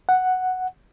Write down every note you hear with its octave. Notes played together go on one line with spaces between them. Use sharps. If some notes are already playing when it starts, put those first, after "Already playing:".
F#5